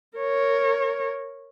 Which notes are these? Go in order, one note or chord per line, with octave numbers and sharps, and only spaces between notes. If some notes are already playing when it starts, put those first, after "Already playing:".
A#4 C#5